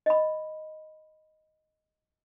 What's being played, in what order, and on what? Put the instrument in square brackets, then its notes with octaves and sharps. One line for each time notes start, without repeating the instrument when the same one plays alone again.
[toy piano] D#5 B5